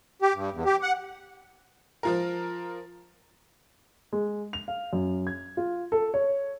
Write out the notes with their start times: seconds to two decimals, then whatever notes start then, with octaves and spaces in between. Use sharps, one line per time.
0.22 G4
0.34 G2
0.53 E2
0.65 G4
0.82 F#5
2.03 F3 F4 A#4
4.13 G#3
4.53 F7
4.68 F5
4.93 F#2
5.27 G#6
5.57 F4
5.92 A4
6.14 C#5